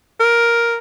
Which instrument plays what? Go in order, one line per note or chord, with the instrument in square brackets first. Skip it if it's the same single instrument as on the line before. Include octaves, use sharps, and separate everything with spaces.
[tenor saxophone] A#4